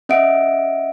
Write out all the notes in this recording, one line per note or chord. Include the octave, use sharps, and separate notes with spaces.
C#4 D#5 E5 F#5 D7